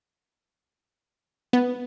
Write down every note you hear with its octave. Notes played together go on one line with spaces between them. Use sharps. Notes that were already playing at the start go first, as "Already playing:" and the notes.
B3